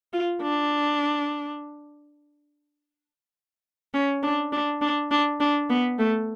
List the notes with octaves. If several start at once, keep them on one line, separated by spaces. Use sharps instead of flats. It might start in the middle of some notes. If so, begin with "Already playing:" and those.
F4
D4
C#4
D4
D4
D4
D4
D4
B3
A3